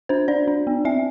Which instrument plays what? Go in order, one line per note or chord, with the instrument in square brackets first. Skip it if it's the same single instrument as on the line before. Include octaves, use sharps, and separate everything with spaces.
[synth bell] D4 C5
D4 D5
D4
B3
C4 E5